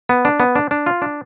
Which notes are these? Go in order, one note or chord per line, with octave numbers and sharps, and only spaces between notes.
B3
D4
B3
D4
D4
F4
D4